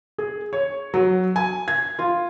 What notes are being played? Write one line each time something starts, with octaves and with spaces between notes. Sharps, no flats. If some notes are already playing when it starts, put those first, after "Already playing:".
G#4
C#5
F#3
G#5
G#6
F4